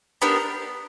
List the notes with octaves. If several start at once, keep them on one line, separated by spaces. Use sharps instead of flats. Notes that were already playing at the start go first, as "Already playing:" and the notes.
B3 D4 G4 A#4